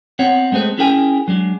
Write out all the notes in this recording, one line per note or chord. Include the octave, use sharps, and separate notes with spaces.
B3 C4 C#5 F#5
G#3 A3 C4 G#4 B4
C#4 E4 G#4 A#4 G5 G#5
F#3 G#3 D4